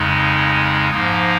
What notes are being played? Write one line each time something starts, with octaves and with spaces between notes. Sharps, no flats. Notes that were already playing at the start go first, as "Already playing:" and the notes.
Already playing: F2 C#3 G#3 D#4
G#2 F3 A#3 D#4